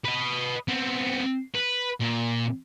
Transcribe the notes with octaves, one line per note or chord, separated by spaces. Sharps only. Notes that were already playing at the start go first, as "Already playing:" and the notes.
B4 D#5
B3 C4
B4
A#2